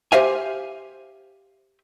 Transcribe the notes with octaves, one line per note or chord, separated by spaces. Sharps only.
G4 C5 E5 F5 G#5